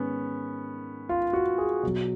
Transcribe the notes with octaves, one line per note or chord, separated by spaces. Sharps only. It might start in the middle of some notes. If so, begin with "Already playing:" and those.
Already playing: G#2 D#3 G#3 B3 C#4
F4
F#4
G#4
B2 F#3